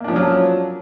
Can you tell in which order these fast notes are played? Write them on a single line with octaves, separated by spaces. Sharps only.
A#3 D4 F3 C#4 F#3